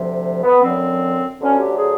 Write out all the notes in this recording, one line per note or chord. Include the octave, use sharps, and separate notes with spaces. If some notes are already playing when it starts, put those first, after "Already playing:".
Already playing: D2 C3 F3
B3
F#2 D3 F3 C4
D2 D3 F#3 C#4
G4
G#4